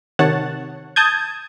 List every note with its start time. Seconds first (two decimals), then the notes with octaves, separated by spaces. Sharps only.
0.19 C3 D#3 C#5 F#5 A5
0.96 A5 D#6 G6 G#6